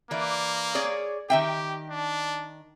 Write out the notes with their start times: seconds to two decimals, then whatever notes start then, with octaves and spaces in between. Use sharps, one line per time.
0.11 E3 A#3 D5
0.75 G#4 C#5 D5
1.30 D#3 G4 E5 G5
1.90 D4